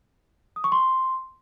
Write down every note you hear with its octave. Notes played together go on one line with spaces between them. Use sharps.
D#6
C#6
C6